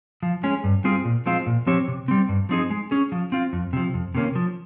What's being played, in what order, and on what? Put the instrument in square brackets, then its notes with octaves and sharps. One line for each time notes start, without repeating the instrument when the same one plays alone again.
[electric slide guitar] F3
G#3 C#4 G#4
G2
G3 C4 F4 G#4
A#2
F3 G#3 C4 F4
A#2
F3 C4 G4 C#5
C3
G3 C4
G2
F3 C4 D#4 G#4
G#3
C#4 G#4
F3
C4 F4
F2
C3 F3
F2
C3 D#3 A#3 C#4
F3